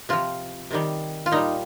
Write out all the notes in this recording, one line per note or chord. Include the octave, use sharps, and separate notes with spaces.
C3 F3 F4
C3 D#3 G3
F4
A#2 G3 D#4